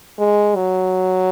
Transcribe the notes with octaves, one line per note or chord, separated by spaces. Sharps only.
G#3
F#3